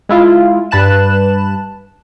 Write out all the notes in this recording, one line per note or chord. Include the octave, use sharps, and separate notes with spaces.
G#3 E4 F4
G2 B4 A5 F#6 E7